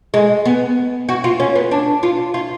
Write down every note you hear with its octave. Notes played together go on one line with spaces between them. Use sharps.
G#3
B3
F#4
F4
C#4
B3
D4
F4
F4